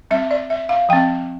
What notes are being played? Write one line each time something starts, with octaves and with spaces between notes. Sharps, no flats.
G3 C4 E5
D5
E5
F5
F3 C4 G5